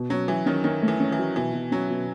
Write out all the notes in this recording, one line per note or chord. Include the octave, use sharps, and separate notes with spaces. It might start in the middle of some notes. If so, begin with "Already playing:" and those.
Already playing: B2
F#3 C#4
E3 F#3
D#3 C#4
D#3 C#4
A3
E3
C#4
E3
F#3
B2 E3
B2
F#3 C#4
B2